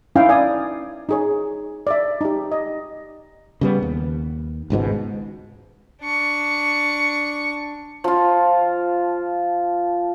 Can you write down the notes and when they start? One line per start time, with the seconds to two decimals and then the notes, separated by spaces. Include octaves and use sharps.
0.16 C#4 D#4 E4 F5 G5
0.29 D5 G#5 D#6
1.09 D#4 G#4 C#5
1.87 D5 E5
2.21 D#4 G4
2.52 D#5
3.61 C#3 G3 B3
3.83 D#2
4.70 G#1 C#2 G#2 B2
6.02 D4 C#6
8.04 F3 F4